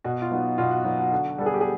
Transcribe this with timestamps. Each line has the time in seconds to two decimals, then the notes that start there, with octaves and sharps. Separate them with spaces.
0.04 B2 F#4
0.22 F4
0.31 F#3 B3 D#4
0.58 B2 F4
0.71 F#4
0.85 F#3 B3 D#4 F#4
0.98 F#4
1.12 D3 F#4
1.38 G3 B3 A4
1.46 G#4
1.54 G4
1.61 G#4